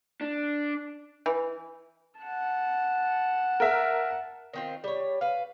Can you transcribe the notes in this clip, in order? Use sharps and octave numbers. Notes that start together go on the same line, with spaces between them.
D4
E3
F#5 A5
A#4 E5
D#3 C4 F4
G3 C#5
B4 F5